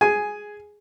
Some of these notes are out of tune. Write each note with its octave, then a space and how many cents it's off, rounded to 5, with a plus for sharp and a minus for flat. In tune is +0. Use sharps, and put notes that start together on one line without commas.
G#4 +0 G#5 +5